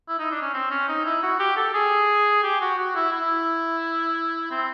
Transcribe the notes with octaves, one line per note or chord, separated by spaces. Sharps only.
E4
D#4
D4
C#4
C4
C#4
D#4
E4
F#4
G4
A4
G#4
G4
F#4
F#4
E4
E4
C4